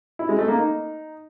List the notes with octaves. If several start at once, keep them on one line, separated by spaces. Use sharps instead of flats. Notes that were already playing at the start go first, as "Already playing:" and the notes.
E4
G#3
A3
A#3
D#4